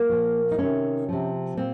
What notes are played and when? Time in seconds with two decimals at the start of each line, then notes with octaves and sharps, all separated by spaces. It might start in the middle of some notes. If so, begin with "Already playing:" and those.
Already playing: A#3
0.09 A#2 F3
0.51 D#4
0.58 C3 D#3 C#4
1.08 C3 F3
1.57 A#2 C4